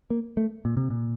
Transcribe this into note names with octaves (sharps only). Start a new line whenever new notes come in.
A#3
A3
A#2
C3
A#2